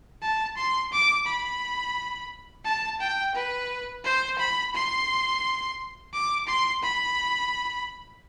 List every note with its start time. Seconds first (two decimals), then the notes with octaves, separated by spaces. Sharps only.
0.22 A5
0.57 C6
0.92 D6
1.27 B5
2.65 A5
3.01 G5
3.35 B4
4.04 C5
4.39 B5
4.74 C6
6.14 D6
6.47 C6
6.83 B5